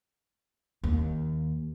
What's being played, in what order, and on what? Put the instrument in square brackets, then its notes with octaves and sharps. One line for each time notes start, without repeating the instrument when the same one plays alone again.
[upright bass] D#2